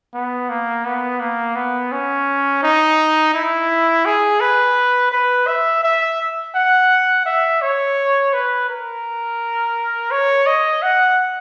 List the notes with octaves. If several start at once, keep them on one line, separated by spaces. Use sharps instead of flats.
B3
A#3
B3
A#3
B3
C#4
D#4
E4
G#4
B4
B4
E5
E5
F#5
E5
C#5
B4
A#4
C#5
D#5
F#5